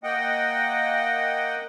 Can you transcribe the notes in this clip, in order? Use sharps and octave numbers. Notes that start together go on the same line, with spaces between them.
A#3 D#5 F#5 G5